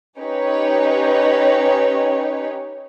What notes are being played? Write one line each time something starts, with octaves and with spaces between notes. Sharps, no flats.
C#4 D#4 G4 B4 C#5